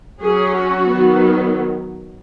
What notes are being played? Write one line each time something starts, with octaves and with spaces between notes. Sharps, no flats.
F#3 C#4 G#4
F#4
D#3 F#3 B3